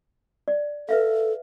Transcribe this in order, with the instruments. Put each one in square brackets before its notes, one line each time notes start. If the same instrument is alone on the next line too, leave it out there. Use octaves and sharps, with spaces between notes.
[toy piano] D5
[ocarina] A4 [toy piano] B4 E5 F5